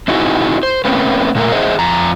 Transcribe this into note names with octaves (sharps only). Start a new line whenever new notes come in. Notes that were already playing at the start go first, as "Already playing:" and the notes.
C4 D#4 E4 F#4 G#4
C5
A3 A#3 C4 C#4 B4
A#2 A3 A#4 E5
G#4 C5 D#5 E5
F2 A#5